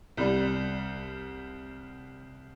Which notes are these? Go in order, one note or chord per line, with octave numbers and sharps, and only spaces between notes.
C2 G3